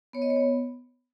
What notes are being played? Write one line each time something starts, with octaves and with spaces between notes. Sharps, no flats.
B3 C#5
D#5
C#5
B3